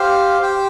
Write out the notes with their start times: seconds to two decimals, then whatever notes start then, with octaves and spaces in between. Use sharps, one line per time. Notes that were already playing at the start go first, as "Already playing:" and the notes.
Already playing: G4 C5 F5
0.41 G4 C5 G5